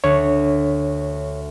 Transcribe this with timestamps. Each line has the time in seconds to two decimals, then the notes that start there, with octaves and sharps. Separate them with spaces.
0.04 D2 C#5